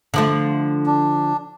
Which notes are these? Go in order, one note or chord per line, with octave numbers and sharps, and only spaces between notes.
D3 F3 A3
D4